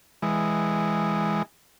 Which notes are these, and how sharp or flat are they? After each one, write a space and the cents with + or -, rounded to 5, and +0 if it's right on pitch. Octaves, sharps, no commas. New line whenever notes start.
E3 +0 G#3 -5